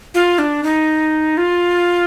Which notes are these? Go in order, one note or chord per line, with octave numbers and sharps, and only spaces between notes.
F4
D4
D#4
F4